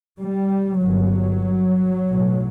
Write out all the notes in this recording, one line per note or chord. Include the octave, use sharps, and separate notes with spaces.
G3
G1 G2 F#3
B1 A2